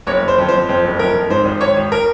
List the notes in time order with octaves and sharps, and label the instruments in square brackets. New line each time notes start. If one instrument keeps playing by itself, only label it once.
[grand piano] F#1 C#5
F#1
C5
F2
C5
F2
F2 C5
F#1
F2 A#4
F2
G#2 C5
G#1
G#1 C#5
G#1
A#4